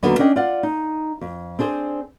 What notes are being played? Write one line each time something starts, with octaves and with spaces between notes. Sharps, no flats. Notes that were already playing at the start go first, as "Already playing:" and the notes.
D#2 D3 D#3 F#3 B3
C#4 D4 D#5 G5
F4 D5 F5 F#5
D#4
F2
C4 D4 G#4 C5